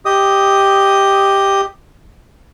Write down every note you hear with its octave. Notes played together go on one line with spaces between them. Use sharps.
G4 D#5 D#6